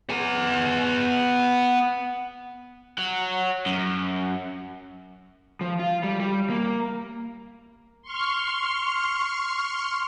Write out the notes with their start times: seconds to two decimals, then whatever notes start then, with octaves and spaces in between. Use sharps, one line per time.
0.10 B3 G#5
2.98 C#5 F#5
3.66 F#2
5.61 F3
5.79 F4
6.04 G3
6.20 G3
6.50 A#3
8.02 C6 C#6 F6